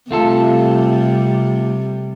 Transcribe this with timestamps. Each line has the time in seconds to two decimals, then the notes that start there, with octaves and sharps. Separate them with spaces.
0.11 C3 G3 A3 F4 A4